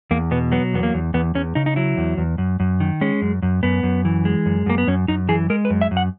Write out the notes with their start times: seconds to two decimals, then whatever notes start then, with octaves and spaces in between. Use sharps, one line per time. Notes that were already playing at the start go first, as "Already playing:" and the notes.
0.11 E2 A#3
0.31 B2 B3
0.52 F#3 B3
0.74 E2 B3
0.83 A#3
0.94 E2
1.14 E2 B3
1.35 E2 C#4
1.55 C#3 D#4
1.66 D#4
1.76 F#3 E4
1.97 E2
2.17 E2
2.38 F#2
2.60 F#2
2.80 D#3
3.01 G#3 C#4
3.22 F#2
3.42 F#2
3.63 F#2 B3
3.83 F#2
4.05 E3
4.25 G#3
4.46 F#2
4.66 F#2 A#3
4.78 B3
4.87 F#2 C#4
5.08 F#2 D#4
5.29 E3 G#4
5.50 G#3 A#4
5.65 B4
5.70 F#2
5.81 E5
5.91 F#2
5.97 F#5